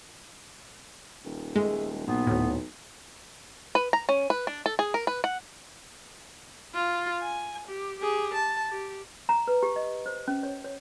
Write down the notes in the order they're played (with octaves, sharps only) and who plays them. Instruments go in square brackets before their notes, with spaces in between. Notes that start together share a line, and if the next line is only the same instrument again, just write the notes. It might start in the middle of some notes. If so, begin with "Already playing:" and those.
[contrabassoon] D#1
[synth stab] G#3 [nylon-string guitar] A3 G#4
[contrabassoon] B1 [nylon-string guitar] A#2 [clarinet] B3
[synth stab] D2 A2
[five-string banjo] B4
A#5
C#4
B4
D4
A4
G#4
A#4
B4
F#5
[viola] F4
G#5
G4
G4 G#4
A5
G4
[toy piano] A#5
B4
G4
D#5
C5
C#4
C#5
C#5